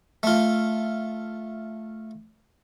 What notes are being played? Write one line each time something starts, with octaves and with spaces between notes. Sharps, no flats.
A3 F4